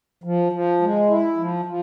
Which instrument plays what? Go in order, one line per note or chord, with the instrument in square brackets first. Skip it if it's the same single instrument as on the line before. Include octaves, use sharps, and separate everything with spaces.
[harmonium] F3
F3
G#3
E4
F3
F3